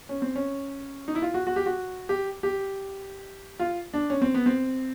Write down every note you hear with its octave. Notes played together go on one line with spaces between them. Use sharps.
C#4
C4
C#4
D#4
E4
F4
F#4
F#4
G4
F#4
G4
G4
F4
D4
C#4
C4
B3
C4